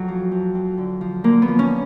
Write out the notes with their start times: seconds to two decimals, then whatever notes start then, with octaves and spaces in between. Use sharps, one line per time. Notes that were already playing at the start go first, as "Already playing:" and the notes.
Already playing: F2 F#3
0.08 F3
0.32 F2
0.55 F2
0.78 D3
1.01 F3
1.24 D3 A#3
1.42 B3
1.48 F3
1.59 C#4